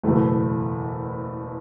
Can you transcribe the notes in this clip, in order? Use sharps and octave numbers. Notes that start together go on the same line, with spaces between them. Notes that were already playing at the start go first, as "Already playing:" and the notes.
F#1 E2 B2 A3 E4